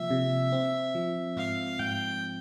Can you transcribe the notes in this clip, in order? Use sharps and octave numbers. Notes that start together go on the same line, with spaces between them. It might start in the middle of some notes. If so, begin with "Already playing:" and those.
Already playing: C3 F3 A#3 E5
C3
C4
F3
G#2 F5
G#2 G5